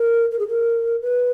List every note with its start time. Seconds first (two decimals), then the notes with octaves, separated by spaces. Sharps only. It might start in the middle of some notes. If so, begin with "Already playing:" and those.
Already playing: A#4
0.32 A#4
0.39 G#4
0.48 A#4
1.01 B4